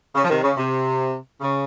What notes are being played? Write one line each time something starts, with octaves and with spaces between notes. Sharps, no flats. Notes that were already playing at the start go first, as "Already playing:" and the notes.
C#3
F3
C3 D#3
C#3
C3
C#3